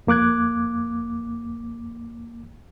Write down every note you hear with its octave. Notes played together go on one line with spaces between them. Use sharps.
F2 A#3 D6 F#6 G#6